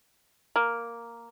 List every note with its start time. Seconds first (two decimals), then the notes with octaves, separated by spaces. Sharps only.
0.56 A#3